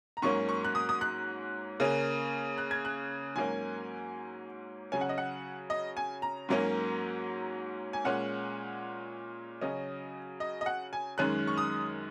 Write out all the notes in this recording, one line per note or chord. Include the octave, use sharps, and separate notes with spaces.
A#5
G#2 F#3 A#3 C#4 C#6
C#6
F#6
D#6
D#6
F#6
C#3 A#3 C#4
F#6
G#6
F#6
G#2 F#3 A#3 C#4 G#5
C#3 F#3 C#4 G#5
F#5
D#5
F#5
D#5
G#5
A#5
G#2 F#3 A#3 C#4
G#5
A#2 G#3 C#4 F#5
C#3 F#3 C#4 D#5
D#5
D#5
F#5
G#5
F#2 D#3 G#3 C#4 F#6
C#6
D#6